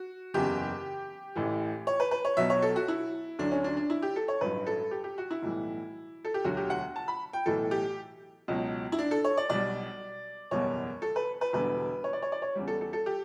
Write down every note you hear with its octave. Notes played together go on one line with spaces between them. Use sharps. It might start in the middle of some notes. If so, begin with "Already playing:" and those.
Already playing: F#4
F#1 E2 C#3 G4
A1 A2 E3
C#5
B4
B4
C#5
B1 B2 F#3 E5
C#5
A4
F#4
E4
D2 D3 F#3 D4
C#4
D4
D4
E4
G4
A4
C#5
A1 G2 F#3 B4
A4
G4
G4
F#4
E4
B1 A2 E3 G3
A4
G4
E1 D2 D3 F#3 F#4
G4
F#5
A5
B5
G5
B1 A2 E3 A4
G4
C#2 B2 F#3
E4
D4
A4
C#5
D5
B1 B2 G3 D5
F#1 E2 B2 G3 C#5
A4
B4
B4
E1 E2 D3 G3 B4
C#5
D5
C#5
D5
C#5
E2 C#3 G3
A4
A4
A4
G4